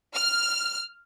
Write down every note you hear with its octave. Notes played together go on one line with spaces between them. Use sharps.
F6